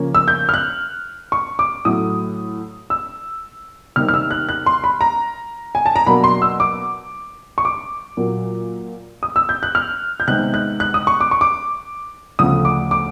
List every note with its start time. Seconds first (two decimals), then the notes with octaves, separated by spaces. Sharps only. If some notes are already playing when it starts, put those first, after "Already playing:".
Already playing: C#3 F3 A#3 C#4
0.15 E6
0.28 G6
0.49 F6
0.54 F#6
1.32 C#6
1.59 D6
1.85 A2 F#3 A3 D#6
2.90 E6
3.96 C3 D#3 G3 A#3 F6
4.08 F6
4.14 E6
4.31 F#6
4.49 F#6
4.66 C6
4.84 B5
5.01 A#5
5.75 G#5
5.86 A5
5.96 A#5
6.06 B2 F#3 A#3 D4 B5
6.24 C6
6.42 E6
6.60 D6
7.58 C#6
7.65 D6
8.17 A#2 F#3 A#3
9.23 D#6
9.36 E6
9.49 G6
9.63 F#6
9.75 F6
10.20 G6
10.28 C3 D#3 G#3 B3 F#6
10.54 F#6
10.80 F#6
10.94 D#6
11.07 C#6
11.21 D6
11.31 C#6
11.41 D6
12.39 D2 C#3 F3 A3 D#6
12.65 D6
12.91 D6